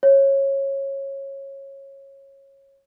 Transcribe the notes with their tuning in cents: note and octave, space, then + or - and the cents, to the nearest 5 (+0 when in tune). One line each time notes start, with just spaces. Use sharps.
C#5 -20